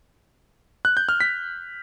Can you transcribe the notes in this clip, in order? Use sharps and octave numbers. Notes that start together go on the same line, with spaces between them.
F#6
G6
F6
B6